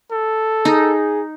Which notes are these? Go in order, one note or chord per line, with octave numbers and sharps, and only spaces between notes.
A4
D#4 G#4